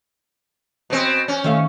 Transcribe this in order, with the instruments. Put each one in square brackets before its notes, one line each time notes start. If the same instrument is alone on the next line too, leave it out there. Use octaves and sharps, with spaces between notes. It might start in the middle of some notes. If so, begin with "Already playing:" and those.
[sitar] B2 C4
C#4
[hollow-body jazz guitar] D#3 A3 F5